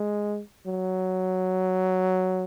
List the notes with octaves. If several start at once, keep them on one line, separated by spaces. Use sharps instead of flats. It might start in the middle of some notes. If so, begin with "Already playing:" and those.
Already playing: G#3
F#3